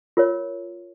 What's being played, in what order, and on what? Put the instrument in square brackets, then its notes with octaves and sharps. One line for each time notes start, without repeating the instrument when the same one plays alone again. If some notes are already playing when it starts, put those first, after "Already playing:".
[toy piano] F4 A#4 C#5